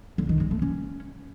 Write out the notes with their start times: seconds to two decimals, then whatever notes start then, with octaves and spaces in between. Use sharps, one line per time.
0.18 D3
0.29 D#3
0.40 G#3
0.51 A3
0.62 C#4